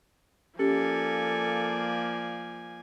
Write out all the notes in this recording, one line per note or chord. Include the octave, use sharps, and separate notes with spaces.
F3 A#3 C#4 G4 A4 D5 G#5